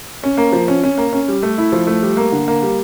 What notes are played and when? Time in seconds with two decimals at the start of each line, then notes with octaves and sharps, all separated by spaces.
0.23 C#4
0.37 A#3
0.53 F3
0.68 C#4
0.83 C#4
0.98 A#3
1.13 C#4
1.28 G3
1.43 A3
1.58 E4
1.72 F3
1.87 A3
2.02 G3
2.17 A#3
2.32 D3
2.48 A#3
2.62 G3